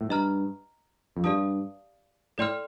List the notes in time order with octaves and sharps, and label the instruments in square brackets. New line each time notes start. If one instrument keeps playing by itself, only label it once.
[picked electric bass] A2
[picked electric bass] G2 [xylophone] D#5 A#5 F6
[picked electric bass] F2
[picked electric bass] G2 [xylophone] G4 D5 F5 A5 D#6
[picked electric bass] A2 [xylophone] A4 D5 G5 C6 F6